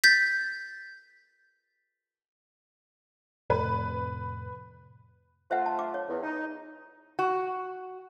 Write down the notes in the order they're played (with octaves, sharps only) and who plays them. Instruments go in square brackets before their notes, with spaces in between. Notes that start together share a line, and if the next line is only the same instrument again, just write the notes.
[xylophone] G6 A6 B6
[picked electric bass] F2 A2 C3 [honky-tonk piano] B4
[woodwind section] A3 F4 [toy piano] C5 E5 F#5
[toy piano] A5
D6
C#5
[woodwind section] E2
D#4
[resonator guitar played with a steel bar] F#4